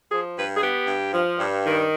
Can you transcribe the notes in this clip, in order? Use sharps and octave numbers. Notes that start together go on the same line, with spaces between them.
F3 G#4
G2 B4
G#4
B3 G4
G2
F3
G2
D#3